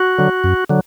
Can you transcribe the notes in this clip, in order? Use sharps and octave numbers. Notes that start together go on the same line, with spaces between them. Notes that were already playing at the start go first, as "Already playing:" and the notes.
Already playing: F#4
D3 F#3
F#2
D3 F#3